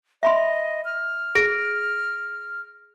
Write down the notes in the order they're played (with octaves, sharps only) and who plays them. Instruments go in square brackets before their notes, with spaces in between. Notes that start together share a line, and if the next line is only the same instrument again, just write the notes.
[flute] D#5 [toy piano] E5 B5 C6
[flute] F6
[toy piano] G#4 [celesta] A#6 D7